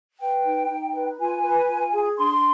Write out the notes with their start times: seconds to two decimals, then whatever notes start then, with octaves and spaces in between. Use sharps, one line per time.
0.20 B4 G5
0.45 D#4
0.70 D#4
0.95 B4
1.19 F4 G#5
1.44 B4
1.68 F4
1.93 G#4
2.18 D4 C6